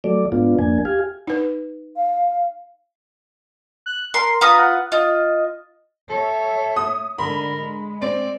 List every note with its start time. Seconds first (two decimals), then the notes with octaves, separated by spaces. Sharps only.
0.04 F#3 A3 D5
0.32 G#2 B3 D4 F4
0.59 F2 A#3 D4 G#5
0.85 G4 F5 G#5
1.27 D#4 B4
1.96 F5
3.86 F#6
4.14 A#4 C6
4.41 F4 B4 A#5 D#6
4.59 F#5
4.92 F4 D#5
6.10 A4 C#5 E5
6.76 D#6
7.18 G#2 D3 A#4 B5
7.56 G#3
8.02 C4 D5